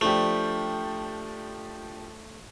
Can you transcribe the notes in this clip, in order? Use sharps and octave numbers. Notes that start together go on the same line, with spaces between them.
F3 A3 D4 G4